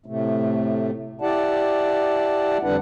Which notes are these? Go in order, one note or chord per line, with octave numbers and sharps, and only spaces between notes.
A2 C3 A3
E4 G4 D5 F#5 A5
F2 D3 G3 D4 B4 F#5